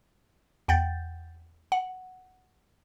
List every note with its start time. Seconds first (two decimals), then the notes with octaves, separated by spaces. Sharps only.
0.68 E2 F#5 G5 G6 A6
1.72 F#5